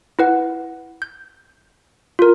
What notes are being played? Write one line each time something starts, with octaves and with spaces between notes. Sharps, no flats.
E4 B4 F#5
G6
F4 A#4